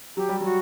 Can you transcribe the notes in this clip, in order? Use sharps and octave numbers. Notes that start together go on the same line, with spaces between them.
F#3 G4
G3
F#3 F#4